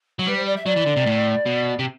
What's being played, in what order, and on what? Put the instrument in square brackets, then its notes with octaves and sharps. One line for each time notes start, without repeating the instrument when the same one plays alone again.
[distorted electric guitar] F#3
[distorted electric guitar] G3 [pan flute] B4
[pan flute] C5
D5
E5
[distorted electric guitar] F#3 [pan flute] D5
[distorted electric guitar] E3
D3
C3
A2
B2
C3